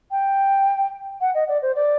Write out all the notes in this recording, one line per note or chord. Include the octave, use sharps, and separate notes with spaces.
G5
F#5
D#5
D5
C5
D5